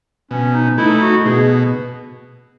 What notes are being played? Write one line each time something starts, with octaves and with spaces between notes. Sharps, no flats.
B2 C#4
D#4
A3 D#4 E4
F#4
B2 G#4